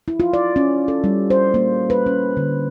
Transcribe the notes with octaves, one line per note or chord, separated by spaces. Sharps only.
E4
F4
D5
C#4
A4
G3
C5
A#3
B4
C#4
D3